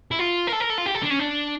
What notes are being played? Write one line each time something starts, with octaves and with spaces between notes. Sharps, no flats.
E4
F4
A#4
A4
A#4
A4
F4
G4
A4
D4
C#4
D4